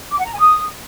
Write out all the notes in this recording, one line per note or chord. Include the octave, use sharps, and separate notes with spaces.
D6
F#5
A#5
G#5
D#6